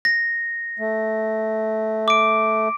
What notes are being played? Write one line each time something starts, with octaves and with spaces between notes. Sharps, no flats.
A#6
A3
D6 D7